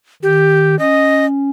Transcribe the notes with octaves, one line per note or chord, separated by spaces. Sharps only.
D#3 G4
C#4 D#5